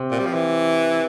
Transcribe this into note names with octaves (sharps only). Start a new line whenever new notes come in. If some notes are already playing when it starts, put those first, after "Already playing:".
Already playing: C3
A#2
G3
F3
E3